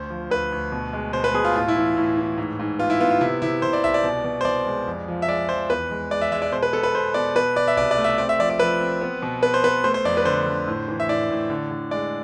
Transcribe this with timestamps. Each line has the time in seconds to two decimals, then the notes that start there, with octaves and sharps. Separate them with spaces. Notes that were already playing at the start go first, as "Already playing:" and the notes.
Already playing: D2 C5
0.10 F3
0.30 D2 B4
0.52 D2
0.72 B2
0.93 G#3
1.13 B2 C5
1.24 B4
1.34 B2 G#4
1.45 F4
1.55 A2 F4
1.68 E4
1.76 E3
1.97 A2
2.17 E3
2.38 G#2
2.59 G#2
2.79 B3 F4
2.90 E4
3.00 B3 F4
3.10 F4
3.21 C3 E4
3.42 C3 E4
3.62 C3 C5
3.73 D5
3.84 C2 E5
3.94 D5
4.04 B2
4.24 B2
4.41 C5
4.45 B2 D5
4.66 G#3
4.87 F2
5.08 F3
5.22 E5
5.29 G#3 D5
5.48 F3 C5
5.70 E2 B4
5.91 G#3
6.11 G#3 D5
6.21 E5
6.32 G#3 E5
6.42 D5
6.52 B2 C5
6.63 B4
6.73 B3 A4
6.83 B4
6.94 B2 C5
7.14 B2 D5
7.36 B2 B4
7.56 B2 D5
7.68 E5
7.77 C2 D5
7.91 D5
7.97 A3
8.04 E5
8.18 C4 D5
8.29 E5
8.39 F3 D5
8.50 D5
8.59 F3 B4
8.80 C4
9.01 B3
9.22 B2
9.43 B3 B4
9.54 C5
9.63 B3 B4
9.84 A3 C5
9.94 C5
10.05 F2 D5
10.17 B4
10.25 D3 C5
10.46 D3
10.68 A2
10.88 E3
11.00 E5
11.08 A2 D5
11.30 A2
11.50 D3
11.71 D3
11.91 G#3 D5